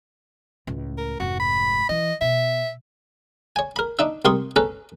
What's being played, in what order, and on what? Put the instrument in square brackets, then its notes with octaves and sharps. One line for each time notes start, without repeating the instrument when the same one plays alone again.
[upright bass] C#2 A2
[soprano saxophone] A#4
[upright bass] F1 G#2 [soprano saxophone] F#4
[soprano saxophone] B5
[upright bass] E3 [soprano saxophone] D#5
[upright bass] B2 [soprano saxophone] E5
[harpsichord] C#5 G#5
A#4 B5
D4 D#4 E5
C2 G4 A#4 C6 C#6 D#6
C#4 A4 B4 A#5